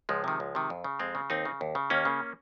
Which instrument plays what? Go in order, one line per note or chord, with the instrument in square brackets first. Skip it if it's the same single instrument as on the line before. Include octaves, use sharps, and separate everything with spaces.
[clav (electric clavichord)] C#2 F3 G#3
C3 D#3
C#2
C3 D#3
F2
C#3
F2 G#3 C4
C#3
D#2 C4 D#4
C#3
D#2
C#3
D#2 A#3 C#4
C#3